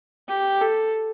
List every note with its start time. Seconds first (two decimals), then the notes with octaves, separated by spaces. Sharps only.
0.28 G4
0.61 A4